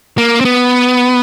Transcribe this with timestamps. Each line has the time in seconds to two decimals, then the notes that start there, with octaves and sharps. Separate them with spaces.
0.18 A#3
0.41 C4
0.45 B3